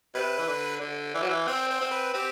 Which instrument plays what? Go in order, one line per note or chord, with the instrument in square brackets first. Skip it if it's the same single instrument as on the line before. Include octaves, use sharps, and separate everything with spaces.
[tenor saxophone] C3 [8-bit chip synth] B4
[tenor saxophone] E3
D3
D3
E3
F#3
E3
[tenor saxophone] C4 [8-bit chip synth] C5
[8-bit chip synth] C5
[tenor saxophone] C4
[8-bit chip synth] B4
[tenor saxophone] C4 [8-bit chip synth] G4